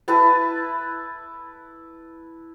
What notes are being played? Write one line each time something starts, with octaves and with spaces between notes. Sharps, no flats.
E4 B4 A5